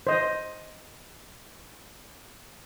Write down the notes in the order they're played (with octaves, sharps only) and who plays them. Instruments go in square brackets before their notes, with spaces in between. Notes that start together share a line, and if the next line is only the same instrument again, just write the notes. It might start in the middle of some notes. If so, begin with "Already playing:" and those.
[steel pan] C5 D#5